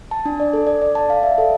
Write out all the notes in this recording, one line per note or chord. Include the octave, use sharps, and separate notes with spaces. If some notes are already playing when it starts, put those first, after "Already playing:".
A5
D4
D5
A4
D5
D5
A5
F5
E5
A4